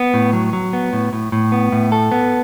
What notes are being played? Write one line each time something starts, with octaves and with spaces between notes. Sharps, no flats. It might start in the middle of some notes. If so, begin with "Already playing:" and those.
Already playing: B3
A2
F#3
F#3
B3
A2
A2
A2
B3
A2
A4
B3